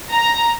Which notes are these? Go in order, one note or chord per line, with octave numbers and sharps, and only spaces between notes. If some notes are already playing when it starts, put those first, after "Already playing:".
A#5